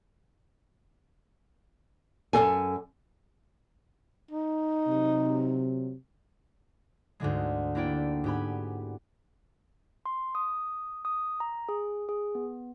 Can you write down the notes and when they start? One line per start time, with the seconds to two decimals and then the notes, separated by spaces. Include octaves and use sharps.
2.33 F#2 C#3 A4 G#5
4.31 D#4
4.88 C3 F#3
7.20 D2 G#2 D3 G#3
7.75 A#3 D4 E4 D5 G5
8.24 G#2 B3 G4 G#5 B5
10.06 C6
10.35 D#6
11.05 D#6
11.40 A#5
11.69 G#4
12.09 G#4
12.35 B3